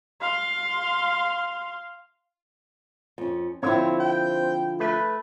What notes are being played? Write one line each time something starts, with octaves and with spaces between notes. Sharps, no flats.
F5 C6
F2 C#4
D3 F3 C4 E4 C#5
G5
A3 B4